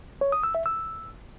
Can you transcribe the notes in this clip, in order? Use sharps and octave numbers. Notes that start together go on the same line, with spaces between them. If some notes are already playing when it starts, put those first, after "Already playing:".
C#5
D#6
E6
E5
E6